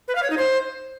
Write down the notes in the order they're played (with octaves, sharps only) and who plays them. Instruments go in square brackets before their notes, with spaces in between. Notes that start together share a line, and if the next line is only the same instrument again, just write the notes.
[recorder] B4
F5
C#5
D#4
C5